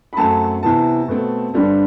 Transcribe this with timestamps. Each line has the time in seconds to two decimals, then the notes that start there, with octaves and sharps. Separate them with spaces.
0.13 B5
0.17 F#2 F#3 A3 C4 A5
0.63 C3 E3 B3 A5
1.08 B2 A3 C4
1.54 G2 D3 G3 C4